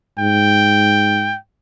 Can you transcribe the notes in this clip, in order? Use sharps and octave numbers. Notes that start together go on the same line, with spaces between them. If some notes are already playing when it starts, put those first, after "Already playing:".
G#2 G5